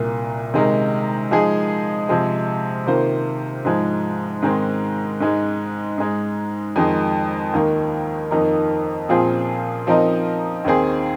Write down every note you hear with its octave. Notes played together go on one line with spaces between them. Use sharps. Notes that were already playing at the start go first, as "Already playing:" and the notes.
Already playing: C2 A#2 A#3
C3 D#3 G#3 D#4 A#4
F3 G#3 D#4 G#4
C3 F3 G#3
C3 D#3 A#3 F4 C5
G#2 F3 G#3
G#2 D#3 G#3 C4
G#2 G#3 D#4
G#2 G#3 D#4
F2 D#3 G#3
D#2 D#3 A#3 D#4
F2 D#3 A#3 D#4 A#4
A#2 F3 C4 F4 G#4
F3 C4 D#4 A#4 D#5
D#2 D#3 C4 G#4